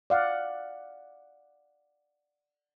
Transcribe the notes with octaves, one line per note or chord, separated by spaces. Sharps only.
D5 F5 F#5